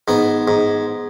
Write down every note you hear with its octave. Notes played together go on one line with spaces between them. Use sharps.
G#2 B3
G#2